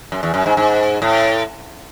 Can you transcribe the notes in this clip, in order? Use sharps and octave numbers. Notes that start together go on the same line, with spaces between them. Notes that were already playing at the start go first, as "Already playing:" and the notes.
F#2
E2
F#2
G#2
G#2
A2